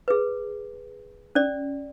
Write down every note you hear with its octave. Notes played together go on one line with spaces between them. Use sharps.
G#4 B4
C#4 D5